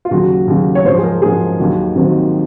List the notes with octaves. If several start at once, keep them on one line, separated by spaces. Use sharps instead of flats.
F4
D#2 C#3 F#3 F#4
D#2 C#3 F#3
C#5
G#2 F3 C5
G#4
A#4
G#2 F3 G#4
D#2 D#3 F#3
D#2 D#3 F#3 C4